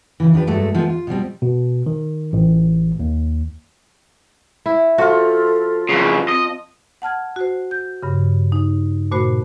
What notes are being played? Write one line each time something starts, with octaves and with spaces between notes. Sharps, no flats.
D2 C#3 E3
F3 D4 G4 B4
G2 F#3 G#3 A3 A4
C3 F3 G#3 A3 B3
F4
B2 F3 G3 C4
B2
D#3
A1
D#2
E4
F3 F4 F#4 A4
F2 C#3
C4 D#5
F#5 A5 F6 G#6
F#4 C5
G6
G2 C#3
D#4
A#2 A3 F#4 C5 B5